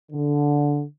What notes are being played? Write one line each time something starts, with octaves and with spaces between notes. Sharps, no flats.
D3